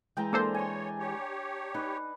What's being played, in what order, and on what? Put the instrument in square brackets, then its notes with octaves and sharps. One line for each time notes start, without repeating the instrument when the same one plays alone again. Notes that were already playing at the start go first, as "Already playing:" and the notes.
[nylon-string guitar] E3 G#3 [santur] G5 A#5
[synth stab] A#3 A4 C5 [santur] D4
[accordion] C#5 [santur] G#5 C6
[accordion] G4 C#5
[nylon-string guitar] D#4 [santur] B4